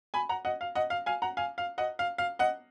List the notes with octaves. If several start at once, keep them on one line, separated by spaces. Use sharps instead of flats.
G#5 B5
F#5 A#5
D#5 F#5
F5
D#5 F#5
F5
F5 G#5
F#5 A#5
F5 G#5
F5
D#5 F#5
F5
F5
D#5 F#5